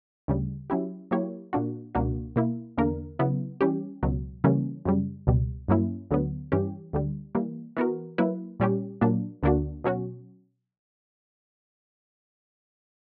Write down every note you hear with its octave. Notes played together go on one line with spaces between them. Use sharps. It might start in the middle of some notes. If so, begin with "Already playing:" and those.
D2 C#3 G3
F#3 C#4 E4 G4
F#3 A#3 E4 G4 C#5
A#2 A#3 D4 F#4
C#2 B2 A#3 D4 F#4
B2 A#3 E4
E2 D3 A#3 D4 A#4
C#3 F#3 B3 E4
E3 G3 C#4 G4
C#2 B2 F#3
C#3 E3 G3 A#3 C#4
F#2 C#3 G3
C#2 B2 G3
G2 F#3 A#3 C#4 E4
D2 D3 F#3 B3
G2 E3 G3 C#4 G4
D2 D3 G3
E3 G3 A#3
E3 B3 F#4 A#4
F#3 A#3 E4 B4
A#2 G3 C#4 G4
A#2 F#3 A#3 D4
D2 D3 A#3 D4 F#4
B2 F#3 C#4 F#4